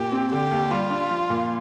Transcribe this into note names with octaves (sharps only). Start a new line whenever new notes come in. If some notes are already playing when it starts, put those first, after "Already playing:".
Already playing: A#2 G4
C4
D3 G4
D#2
G3 F4
D4
F3
A#2